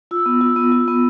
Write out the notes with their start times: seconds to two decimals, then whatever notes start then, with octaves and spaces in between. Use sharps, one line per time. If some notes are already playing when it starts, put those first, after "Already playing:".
0.11 F4 E6
0.26 B3
0.41 F4
0.56 B3
0.72 F4
0.88 B3